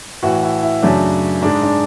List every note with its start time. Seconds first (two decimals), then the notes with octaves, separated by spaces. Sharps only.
0.23 A2 E3 A3 F#4
0.43 E4
0.63 E4
0.83 F#2 C#3 F#3 A3 D4
1.42 G#2 G#3 D4
1.63 D4